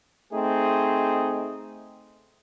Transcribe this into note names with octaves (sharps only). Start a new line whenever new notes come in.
A3 C4 D#4 G#4